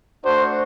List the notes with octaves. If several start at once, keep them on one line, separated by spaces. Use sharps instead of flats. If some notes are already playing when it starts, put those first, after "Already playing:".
A3 D4 F#4 C5